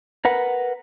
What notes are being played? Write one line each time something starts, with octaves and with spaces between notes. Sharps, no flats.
A#4 B4 F#5